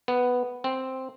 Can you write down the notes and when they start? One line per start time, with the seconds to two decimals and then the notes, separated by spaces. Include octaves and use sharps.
0.08 B3
0.64 C4